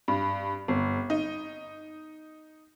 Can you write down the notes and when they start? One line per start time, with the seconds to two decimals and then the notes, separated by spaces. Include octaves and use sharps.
0.08 G2
0.68 G1
1.10 D#4